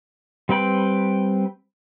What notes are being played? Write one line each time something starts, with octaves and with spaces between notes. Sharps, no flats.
G3 C4 B4 G5 B5